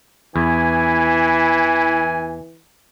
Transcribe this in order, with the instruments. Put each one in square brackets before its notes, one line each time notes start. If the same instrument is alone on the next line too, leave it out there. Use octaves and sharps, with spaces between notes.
[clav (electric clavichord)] E2 [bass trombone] E3 [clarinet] E4 [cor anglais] G#5